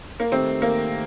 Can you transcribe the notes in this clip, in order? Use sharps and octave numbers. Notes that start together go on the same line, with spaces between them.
A#3
D#3 A3 C4 D#4 G4
A#3